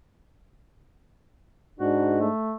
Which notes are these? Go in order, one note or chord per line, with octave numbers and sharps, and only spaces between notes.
G#2 D4 F#4
A3